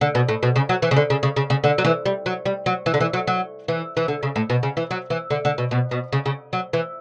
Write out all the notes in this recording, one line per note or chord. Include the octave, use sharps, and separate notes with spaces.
D3
B2
A2
B2
C#3
F#3
E3
C#3
D3
C#3
C#3
C#3
C#3
D3
F#3
E3
G3
F#3
G3
F#3
E3
D3
E3
F#3
F#3
E3
E3
D3
C#3
A2
B2
C#3
E3
F#3
E3
D3
D3
B2
B2
B2
C#3
C#3
F#3
E3